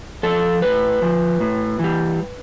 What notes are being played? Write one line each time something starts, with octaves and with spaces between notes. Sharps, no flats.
F3 A4
A2 B4
F3
A2
E3 G3